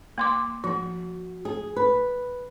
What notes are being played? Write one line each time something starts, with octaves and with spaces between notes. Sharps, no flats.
A#3 C6 D6
F3 F#4
G#4
B4